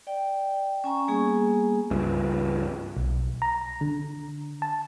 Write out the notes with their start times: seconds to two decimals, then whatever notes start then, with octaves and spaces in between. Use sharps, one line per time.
0.07 D5 G5
0.84 C#4 G#5 A#5 C#6
1.08 G3 A#3 B3 G#4 G#5
1.91 C#2 G2
2.97 B1
3.42 A#5
3.81 D3
4.62 A5